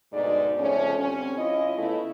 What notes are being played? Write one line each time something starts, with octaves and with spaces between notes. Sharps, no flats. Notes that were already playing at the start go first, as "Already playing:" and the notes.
D2 G#2 B2 D#4 D5
F2 C#3 A3 C#4
D3 G3 C4 C#4
C#4 E4 F4 D#5
C#3 A3 B3 E4